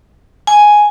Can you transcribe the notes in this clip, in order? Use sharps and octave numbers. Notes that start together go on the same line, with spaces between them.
G#5